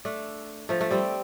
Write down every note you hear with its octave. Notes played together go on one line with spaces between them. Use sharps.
A3 D4
F3 A3
A3
G3 C4